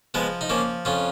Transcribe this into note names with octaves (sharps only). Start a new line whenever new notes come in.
F3 G#3 B3
D#4
F3 A#3 C#4
F2 C#4 F4